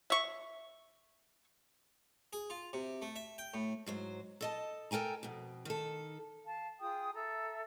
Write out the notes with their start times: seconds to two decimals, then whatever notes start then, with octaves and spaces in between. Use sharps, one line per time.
0.10 E5 C#6
2.33 G#4
2.50 F4
2.73 C3
3.02 A3
3.16 E5
3.38 G5
3.54 A2
3.86 G#2 F#3 C5
4.41 A4 D#5 A5
4.91 A4 A#4 G5 G#5 A#5
5.23 F2 B2
5.65 D#3 A4
6.45 F5 A5
6.80 F4 G#4 G5 D#6
7.13 A4 E5 A#5 E6